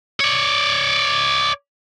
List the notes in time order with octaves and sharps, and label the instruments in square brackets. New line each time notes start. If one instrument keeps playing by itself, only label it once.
[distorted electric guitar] C#5 D5